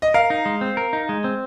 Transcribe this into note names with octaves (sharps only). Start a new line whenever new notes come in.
D#5
A#4 F5
D#4
G#3
C4
A#4
D#4
G#3
C4